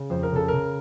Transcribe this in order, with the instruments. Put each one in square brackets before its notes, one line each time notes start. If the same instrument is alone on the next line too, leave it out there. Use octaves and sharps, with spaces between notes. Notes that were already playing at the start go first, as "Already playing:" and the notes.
Already playing: [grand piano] C#3
F2 C5
A#4
C#3 A4
C#3 A#4